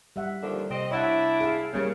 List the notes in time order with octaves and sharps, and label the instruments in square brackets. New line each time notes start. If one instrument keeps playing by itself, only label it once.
[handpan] G3 E5 F#5
[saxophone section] D#2 D3 F3
[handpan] C3 [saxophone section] C4 D#5
[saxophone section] D4 E4 [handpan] C#5 F#5
[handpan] G#4 F5
[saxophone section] C#3 [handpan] G3 A#3